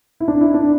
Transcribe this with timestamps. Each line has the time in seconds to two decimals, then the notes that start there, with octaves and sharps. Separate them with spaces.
0.20 E4
0.28 D4
0.41 E4
0.54 D4